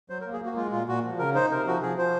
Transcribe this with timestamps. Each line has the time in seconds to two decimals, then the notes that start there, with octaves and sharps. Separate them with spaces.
0.09 F#3 C5
0.21 A#4
0.26 A#3
0.33 G#4
0.41 A#3
0.46 F#4
0.56 G#3 F4
0.72 A#2 F4
0.87 A#2 F#4
1.04 F3
1.19 C#3 A#4
1.34 D#4 C5
1.51 C3 A#4
1.66 F3 F#4
1.82 F3 G#4
1.98 F3 C5